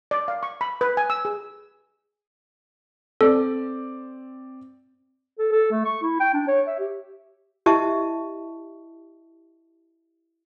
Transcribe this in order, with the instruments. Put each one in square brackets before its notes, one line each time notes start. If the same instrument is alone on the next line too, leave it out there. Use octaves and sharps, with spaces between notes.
[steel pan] D5
F5
C#6
B5
B4
G#5
E6
G#4
[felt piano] C4 D5 [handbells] A4
[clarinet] A4
A4
A3
C#6
E4
G5
D4
C#5
E5
G4
[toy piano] E4 G4 D#5 E5 A5 C#6